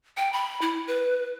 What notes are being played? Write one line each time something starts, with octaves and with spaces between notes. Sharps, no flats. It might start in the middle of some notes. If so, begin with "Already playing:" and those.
G5
B5
E4
B4